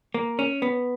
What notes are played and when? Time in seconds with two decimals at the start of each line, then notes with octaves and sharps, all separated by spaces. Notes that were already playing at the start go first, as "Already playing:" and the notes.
0.14 A#3
0.39 C#4
0.62 B3